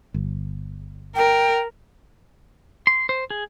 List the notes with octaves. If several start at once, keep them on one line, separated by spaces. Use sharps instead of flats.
G1
A#4 G5
C6
C5
G#4